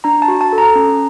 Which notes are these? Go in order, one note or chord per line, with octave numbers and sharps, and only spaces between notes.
D4 A#5
A5
F#4
A5
A4
A#5
C#4